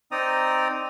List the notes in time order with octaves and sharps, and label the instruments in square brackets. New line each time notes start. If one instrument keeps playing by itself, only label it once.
[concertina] C4 D#4 D5 A#5 D#6